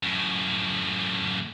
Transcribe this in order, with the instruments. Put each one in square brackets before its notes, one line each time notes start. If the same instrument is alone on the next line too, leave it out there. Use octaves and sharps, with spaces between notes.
[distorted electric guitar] F#2 A2